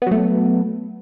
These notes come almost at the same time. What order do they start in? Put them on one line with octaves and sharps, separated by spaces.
B3 F#3 A3